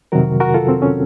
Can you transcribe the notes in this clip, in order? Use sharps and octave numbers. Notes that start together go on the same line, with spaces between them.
F2 C3 D#3 F#3 F#4 A#4
F#4 A#4
F4 A4
C4
C#4